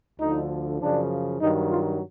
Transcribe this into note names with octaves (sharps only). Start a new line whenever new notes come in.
D2 D3 F3 D#4
F#2 C#3 F3 D4
G2 D#3 F#3 D#4
F4